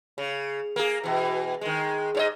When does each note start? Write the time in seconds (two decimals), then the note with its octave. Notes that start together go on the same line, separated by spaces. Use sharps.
0.18 C#3
0.76 A#3 G#4
1.04 B2 E3
1.61 D#3 G#3
2.15 G#2 C#5 D#5